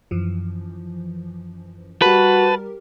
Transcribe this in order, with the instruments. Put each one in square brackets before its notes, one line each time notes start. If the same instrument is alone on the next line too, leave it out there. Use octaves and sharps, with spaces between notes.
[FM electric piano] F#2 E3 F3
[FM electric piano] G3 G4 A#4 [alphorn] F#4 [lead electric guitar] B4 [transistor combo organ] A5